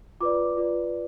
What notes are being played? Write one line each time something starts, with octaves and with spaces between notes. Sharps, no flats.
F4 B4 D5 D6
F4 B4 D5